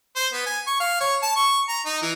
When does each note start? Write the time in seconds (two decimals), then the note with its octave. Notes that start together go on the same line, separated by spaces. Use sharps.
0.16 C5
0.33 B3
0.46 G#5
0.67 C#6
0.80 F5
1.01 C#5
1.23 A5
1.36 C#6
1.69 A#5
1.86 D#4
2.02 E3